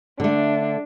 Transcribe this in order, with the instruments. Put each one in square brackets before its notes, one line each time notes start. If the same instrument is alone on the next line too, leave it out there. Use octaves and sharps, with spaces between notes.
[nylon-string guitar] D3 A3 [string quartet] D4